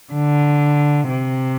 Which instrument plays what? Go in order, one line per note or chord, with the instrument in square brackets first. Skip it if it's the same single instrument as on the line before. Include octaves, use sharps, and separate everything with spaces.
[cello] D3
C3